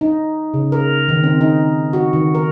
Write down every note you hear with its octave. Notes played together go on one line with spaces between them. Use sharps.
D#4
C#3
A#4
D#3
C4
D#4
F#4
D#3
A#4